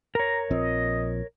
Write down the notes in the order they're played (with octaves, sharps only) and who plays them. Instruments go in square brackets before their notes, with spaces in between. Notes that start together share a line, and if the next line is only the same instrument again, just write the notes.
[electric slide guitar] A#4 C#5 [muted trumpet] A#5
[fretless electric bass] A#1 F3 C4 [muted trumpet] D#5